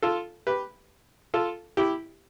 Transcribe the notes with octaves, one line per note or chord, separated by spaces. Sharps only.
F4 A4
G4 B4
F4 A4
E4 G4